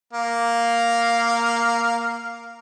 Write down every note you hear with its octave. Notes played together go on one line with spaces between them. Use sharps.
A#3 F5